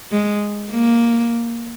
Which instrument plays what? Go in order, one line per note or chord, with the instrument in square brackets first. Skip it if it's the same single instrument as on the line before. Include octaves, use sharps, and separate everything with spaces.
[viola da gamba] G#3
A#3